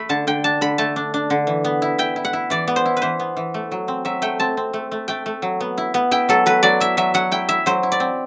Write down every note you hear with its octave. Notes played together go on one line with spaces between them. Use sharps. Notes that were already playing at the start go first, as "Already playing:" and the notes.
Already playing: A3 B5
D3 A5
D3 G5
D4 A5
D3 B5
A3 A5
D4
D4
D3
E3
B3
E4
E4 G5
E4
F#5
E4
E3 D5
B3
C5
E4
B4
E3 C5
B3
E3
A3
F#3
C4
F#3 E5
A3 G5
C4 A5
C4
A3
A3
A3 G5
A3
F#3
B3
E4
B3
E4 G5
F#3 A4
F#3 B4
F#3 D5
E4 E5
F#3 E5
F#3 F#5
E4 G5
E4 E5
F#3 C5
E4
D5
C4